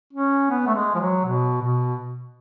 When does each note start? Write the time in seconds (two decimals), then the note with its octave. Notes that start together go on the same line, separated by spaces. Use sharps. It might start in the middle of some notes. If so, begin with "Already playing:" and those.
0.13 C#4
0.50 B3
0.67 A3
0.75 G#3
0.95 F3
1.00 F#3
1.24 B2
1.62 B2